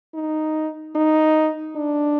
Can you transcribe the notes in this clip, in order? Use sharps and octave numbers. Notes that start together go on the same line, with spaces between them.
D#4
D#4
D4